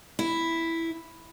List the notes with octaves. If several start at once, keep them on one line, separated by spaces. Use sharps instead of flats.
E4